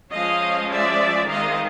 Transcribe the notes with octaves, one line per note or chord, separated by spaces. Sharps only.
F3 G#3 C#4 D#5 F5
D5 E5
D#3 G#3 C4 D#5 F5